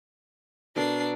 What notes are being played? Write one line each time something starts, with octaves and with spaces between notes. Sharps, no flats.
B2 D4 A4 A#4 C7